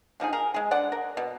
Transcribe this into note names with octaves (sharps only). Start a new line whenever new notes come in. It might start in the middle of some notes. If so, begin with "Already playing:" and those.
D3 F3 D#4 G#4
G#4 A#4
G#3 G#4
D3 D5 F#5
A#4
B2